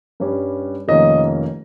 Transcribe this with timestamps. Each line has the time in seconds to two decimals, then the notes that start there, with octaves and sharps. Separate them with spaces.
0.20 G2 G3 C#4
0.88 F1 F2 D#3 A#3 C#4 D#5